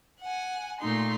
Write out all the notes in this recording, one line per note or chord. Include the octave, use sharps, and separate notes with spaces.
F#5 G#5
A#2 A3 D#4 C6